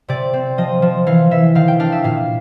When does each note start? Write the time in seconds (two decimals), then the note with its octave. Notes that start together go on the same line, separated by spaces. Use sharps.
0.08 C3 D5
0.33 C4
0.58 F3 D#5
0.82 F3
1.07 E3 F5
1.31 E3 E5
1.55 D#3 F5
1.68 G5
1.80 D4 F5
1.92 E5
2.04 A#2 F5